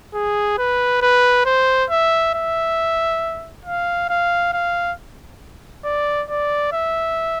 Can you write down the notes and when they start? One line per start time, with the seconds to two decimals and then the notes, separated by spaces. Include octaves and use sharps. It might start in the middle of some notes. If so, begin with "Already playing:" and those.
0.14 G#4
0.58 B4
1.02 B4
1.45 C5
1.90 E5
2.34 E5
3.65 F5
4.09 F5
4.53 F5
5.84 D5
6.29 D5
6.72 E5